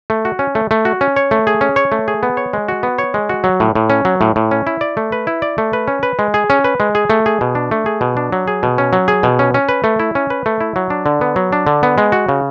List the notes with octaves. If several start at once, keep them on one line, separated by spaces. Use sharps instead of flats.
A3
F#4
C#4
A3
A3
F#4
C#4
C#5
A3
G#4
C#4
C#5
A3
G#4
B3
C#5
G#3
F#4
B3
C#5
G#3
F#4
F#3
A2
A2
C#4
F#3
A2
A2
C#4
E4
D5
A3
B4
E4
D5
A3
B4
C#4
B4
G#3
G#4
C#4
B4
G#3
G#4
A3
G#4
B2
D4
A3
G#4
B2
D4
F#3
G#4
B2
C#4
F#3
G#4
B2
C#4
C#4
B4
A3
E4
C#4
B4
A3
E4
F#3
D4
D3
B3
F#3
D4
D3
B3
G#3
F#4
C#3